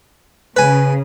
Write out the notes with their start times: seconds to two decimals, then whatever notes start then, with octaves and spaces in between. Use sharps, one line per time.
0.56 C#3 B4 G#5